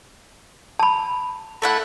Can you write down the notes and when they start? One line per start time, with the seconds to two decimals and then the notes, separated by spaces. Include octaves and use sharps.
0.79 A5 B5
1.62 A3 E4 F#5